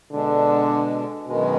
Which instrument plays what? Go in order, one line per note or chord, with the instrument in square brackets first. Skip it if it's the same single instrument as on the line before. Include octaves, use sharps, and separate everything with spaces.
[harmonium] B2 G#3 D4 [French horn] D3
[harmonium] F#2 D#3 G#3 [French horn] B2